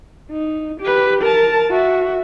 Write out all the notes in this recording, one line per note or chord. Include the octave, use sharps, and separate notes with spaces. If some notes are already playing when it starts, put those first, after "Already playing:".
D#4
G4 B4
A#4 A5
F#4 E5